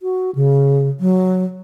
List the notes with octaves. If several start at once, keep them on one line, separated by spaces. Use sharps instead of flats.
F#4
C#3
F#3